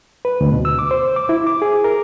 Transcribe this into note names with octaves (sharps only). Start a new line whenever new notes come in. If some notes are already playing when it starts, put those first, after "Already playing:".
B4
D2
B2
E6
D6
C5
D6
E4
D6
G#4
A#4